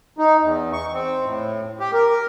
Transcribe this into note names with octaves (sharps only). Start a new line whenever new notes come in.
D#4
E2
C#6
C4
A2
G4
A#4